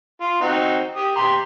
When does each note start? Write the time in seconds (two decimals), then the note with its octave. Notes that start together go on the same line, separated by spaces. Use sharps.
0.20 F4
0.41 C4 D#4 F#4
0.95 G4 D#6
1.16 G4 A#5 C6